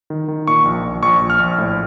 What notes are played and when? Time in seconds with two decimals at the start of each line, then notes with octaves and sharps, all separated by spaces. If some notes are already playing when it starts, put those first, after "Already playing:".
0.10 D#3
0.28 D#3
0.47 A#2 C#6
0.65 A#1
0.84 A#1
1.02 A#1 C#6
1.21 A#1
1.30 F6
1.40 A#1
1.58 A2